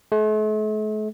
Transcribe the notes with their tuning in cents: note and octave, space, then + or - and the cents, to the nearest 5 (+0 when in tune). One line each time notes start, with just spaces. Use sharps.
A3 -45